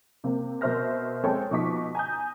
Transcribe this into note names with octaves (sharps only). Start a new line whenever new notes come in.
C3 A#3 C4
B2 A#4 C5 E5 F6 A#6
G#3 C4 A4 C5 C#5 G5
B2 F3 D#4 C#6 D6 B6
G#5 A#5 D#6 G6